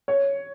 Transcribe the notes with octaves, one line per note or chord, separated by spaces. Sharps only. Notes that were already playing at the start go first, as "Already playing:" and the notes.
C#5